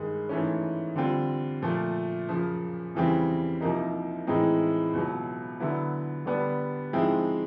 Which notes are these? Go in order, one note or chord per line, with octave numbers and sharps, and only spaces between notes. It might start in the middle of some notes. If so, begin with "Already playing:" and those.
Already playing: G2 D#3 G#3
G#2 E3 A3 C#4
D3 G3 C4 F4
A#2 F3 A3
F#2 C#3 F3
E2 C#3 E3 G3 C4
C2 C3 F3 A#3 D#4
A2 E3 G#3 C4 D#4
C#2 B2 F#3
D3 F#3 B3 E4
D3 G3 B3 D4
G#2 F3 G#3 C4 E4